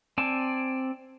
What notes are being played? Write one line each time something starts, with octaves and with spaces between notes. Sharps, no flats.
C4 D5 G#5 A5